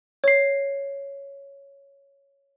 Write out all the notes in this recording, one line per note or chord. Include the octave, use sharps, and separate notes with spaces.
C#5 C7